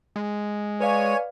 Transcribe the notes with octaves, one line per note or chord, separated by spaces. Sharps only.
G#3
B4 C#5 D5 F5 G#5